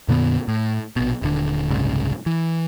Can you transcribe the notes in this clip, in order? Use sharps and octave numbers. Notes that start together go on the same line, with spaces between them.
F2 A#2 D3 B3
A2
A#1 B2
D#1 D3
F#1 C2 G#2 C#3
E3